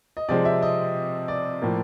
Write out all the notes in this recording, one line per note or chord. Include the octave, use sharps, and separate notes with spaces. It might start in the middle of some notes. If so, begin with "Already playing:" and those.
D#5
C3 F3 G#3 C4 D5
E5
D#5
D5
A2 F3 A#3